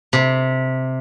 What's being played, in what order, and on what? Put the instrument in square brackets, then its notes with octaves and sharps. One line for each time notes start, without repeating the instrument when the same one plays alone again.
[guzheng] C3